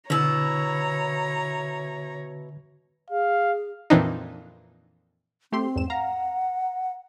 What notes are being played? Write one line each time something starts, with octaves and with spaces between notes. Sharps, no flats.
B2 D3 E4 C#5 A#5
G#4 F5
F2 A#2 E3 C4 D4 D#4
A3 C4 G4 C6
E2 G#2 E7
F5 F#5 A#5